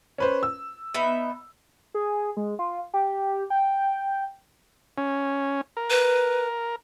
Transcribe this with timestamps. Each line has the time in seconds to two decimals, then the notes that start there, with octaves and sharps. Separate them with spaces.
0.18 C#4 B4 C5
0.43 E6
0.94 B3 D#4 E5
1.94 G#4
2.37 G#3
2.59 F4
2.94 G4
3.50 G5
4.98 C#4
5.77 A#4
5.90 B4